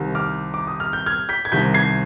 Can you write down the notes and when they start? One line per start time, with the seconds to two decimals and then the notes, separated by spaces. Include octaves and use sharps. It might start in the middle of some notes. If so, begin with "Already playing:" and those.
Already playing: C2 C3 D#3
0.15 D6 F6
0.54 D6
0.67 D#6
0.80 F6
0.93 G6
1.06 F6 G#6
1.29 G6 B6
1.45 G#6
1.52 C2 C3 D#3 G6 B6
1.74 G#6 C7